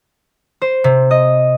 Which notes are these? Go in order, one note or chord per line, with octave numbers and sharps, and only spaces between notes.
C5
C3
D#5